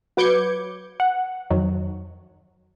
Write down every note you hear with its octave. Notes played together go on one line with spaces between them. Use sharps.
F#3 B4 D6 G6 G#6 C#7
F#5
F2 D#3 F#3